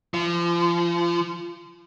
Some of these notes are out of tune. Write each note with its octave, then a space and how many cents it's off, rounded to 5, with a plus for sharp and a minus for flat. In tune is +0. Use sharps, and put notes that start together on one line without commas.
F3 -30